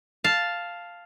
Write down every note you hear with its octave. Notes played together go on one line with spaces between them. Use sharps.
F5 A5